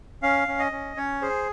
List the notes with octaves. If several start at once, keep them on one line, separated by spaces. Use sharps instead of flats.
C#4 F5
C#4
D#5
C#4
C#4 C#5
G#4 C5